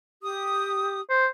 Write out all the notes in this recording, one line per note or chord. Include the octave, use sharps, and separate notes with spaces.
G4 D#6
C5